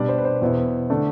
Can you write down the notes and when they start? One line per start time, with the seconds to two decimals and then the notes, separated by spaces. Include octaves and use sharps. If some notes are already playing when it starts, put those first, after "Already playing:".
Already playing: B2 G3 D4 D5
0.09 C5
0.18 B4
0.25 C5
0.42 E2 B2 B3 E4
0.90 D3 A3 D4